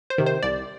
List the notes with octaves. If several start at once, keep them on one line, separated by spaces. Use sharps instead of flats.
C5
C3 D#3
C5
C2 D5